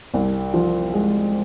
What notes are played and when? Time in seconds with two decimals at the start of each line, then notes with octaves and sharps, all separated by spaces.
0.14 C2
0.54 F3
0.93 G#3